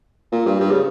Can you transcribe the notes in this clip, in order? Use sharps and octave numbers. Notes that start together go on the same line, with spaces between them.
A#2
G2
G2
C#3